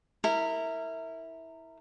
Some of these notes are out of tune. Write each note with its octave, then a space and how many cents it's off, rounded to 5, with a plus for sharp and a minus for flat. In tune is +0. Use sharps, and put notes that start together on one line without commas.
E4 -15 A#4 -25